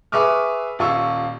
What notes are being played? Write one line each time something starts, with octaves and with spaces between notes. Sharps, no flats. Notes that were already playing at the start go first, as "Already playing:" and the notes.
G#4 B4 E5 C#6 D6 F6
D#1 F4 C#6 E6